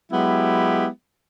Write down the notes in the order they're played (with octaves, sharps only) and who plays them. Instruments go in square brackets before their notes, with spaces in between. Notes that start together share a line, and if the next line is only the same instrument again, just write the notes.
[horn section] F#3 G#3 B3 E4 G4